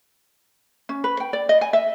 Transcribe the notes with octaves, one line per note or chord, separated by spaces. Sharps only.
C#4
B4
G5
D5
D#5
G#5
E5